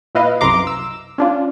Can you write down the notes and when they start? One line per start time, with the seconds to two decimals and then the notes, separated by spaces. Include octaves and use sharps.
0.15 A#2 E4 B4 D#5 F5
0.41 C2 F#2 C3 A#5 C6 D6
0.67 E6
1.18 C#4 D4 F4